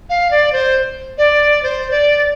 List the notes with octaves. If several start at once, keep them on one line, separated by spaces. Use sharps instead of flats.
F5
D5
C5
D5
C5
D5